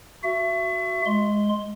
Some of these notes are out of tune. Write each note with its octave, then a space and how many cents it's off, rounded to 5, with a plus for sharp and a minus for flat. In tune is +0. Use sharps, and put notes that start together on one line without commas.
F#4 +0 E5 +30
G#3 +0 C6 +0